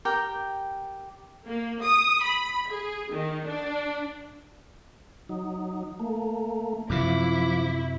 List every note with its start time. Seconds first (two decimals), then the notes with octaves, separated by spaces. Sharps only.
0.05 G4 A#4 G5
1.47 A#3
1.83 D#6
2.23 B5
2.70 G#4
3.12 D#3
3.46 D4
5.29 F#3 D#4
5.99 A3 A#3
6.90 F#2 C3 F3 E4 D6